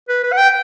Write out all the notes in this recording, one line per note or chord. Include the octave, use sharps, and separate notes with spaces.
B4
B4
F#5
G5